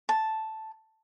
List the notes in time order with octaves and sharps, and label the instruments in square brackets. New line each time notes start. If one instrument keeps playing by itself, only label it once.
[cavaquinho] A5